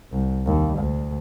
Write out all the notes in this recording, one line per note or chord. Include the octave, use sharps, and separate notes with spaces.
C2
D#2
D2